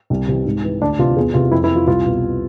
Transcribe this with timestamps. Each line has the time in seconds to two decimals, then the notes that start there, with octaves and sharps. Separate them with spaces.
0.10 C2
0.28 C3 E3
0.46 G#2
0.64 E3
0.80 D2 D4
0.99 C3 E3 F4
1.17 E2 G#4
1.34 C3 E3 F4
1.51 F2 E4
1.64 E4
1.70 E3
1.76 F4
1.87 C2 F4
2.05 B2